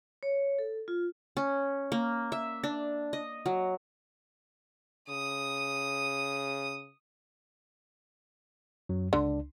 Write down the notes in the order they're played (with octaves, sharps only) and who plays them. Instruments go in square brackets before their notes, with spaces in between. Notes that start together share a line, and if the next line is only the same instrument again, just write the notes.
[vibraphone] C#5
A4
F4
[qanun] C#4
A#3
E5
D4
D#5
F#3
[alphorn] C#3 [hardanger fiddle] D#6
[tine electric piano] F#2 F#3
[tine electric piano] C#2 D4 [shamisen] D3